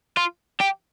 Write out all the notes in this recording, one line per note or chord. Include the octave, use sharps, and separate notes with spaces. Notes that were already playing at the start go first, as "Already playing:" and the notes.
F4
G4